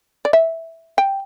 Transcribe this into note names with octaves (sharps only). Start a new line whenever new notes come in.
D5
E5
G5